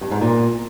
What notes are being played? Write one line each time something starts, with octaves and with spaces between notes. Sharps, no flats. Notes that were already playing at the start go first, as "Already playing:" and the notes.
G2
G#2
A#2